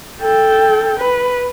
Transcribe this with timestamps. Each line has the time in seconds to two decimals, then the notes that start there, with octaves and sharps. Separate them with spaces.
0.21 A4 G5
0.99 B4